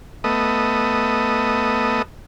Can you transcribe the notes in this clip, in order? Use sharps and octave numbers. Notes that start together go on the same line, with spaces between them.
A3 B3 D#5